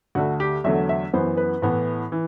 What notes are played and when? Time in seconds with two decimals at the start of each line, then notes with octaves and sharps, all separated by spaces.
0.15 D2 D3 A3 F#4
0.40 G4
0.64 E2 D3 F#3 A3 E5
0.89 E5
1.13 F#2 E3 B3 C5
1.37 B4
1.62 A2 E3 B3
2.12 E3